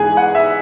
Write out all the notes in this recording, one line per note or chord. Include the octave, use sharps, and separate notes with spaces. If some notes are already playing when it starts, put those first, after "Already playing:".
Already playing: G#2 E3 G#3 B3 G#4 G#5
F#5
E5